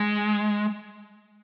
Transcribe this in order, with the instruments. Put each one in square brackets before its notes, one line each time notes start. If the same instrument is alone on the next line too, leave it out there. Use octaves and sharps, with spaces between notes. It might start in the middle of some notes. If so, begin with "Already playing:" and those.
Already playing: [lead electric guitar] G#3